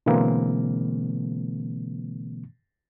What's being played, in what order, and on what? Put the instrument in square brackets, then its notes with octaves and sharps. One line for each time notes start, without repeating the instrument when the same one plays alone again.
[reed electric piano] B2 D3 E3 G#3 A#3 C4